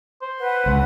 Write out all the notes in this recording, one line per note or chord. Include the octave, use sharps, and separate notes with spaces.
C5
B4 F#5
C#2